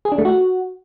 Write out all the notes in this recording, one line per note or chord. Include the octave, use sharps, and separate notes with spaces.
G#4
D4
A3
F#4